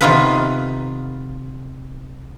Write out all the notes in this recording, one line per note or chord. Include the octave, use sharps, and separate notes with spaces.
C3 D#3 B3 F4 A4 B4